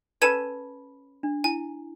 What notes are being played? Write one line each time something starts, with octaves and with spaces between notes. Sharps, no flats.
C#4 A4 B4 B5 G#6 D#7 E7
D4
E4 G#5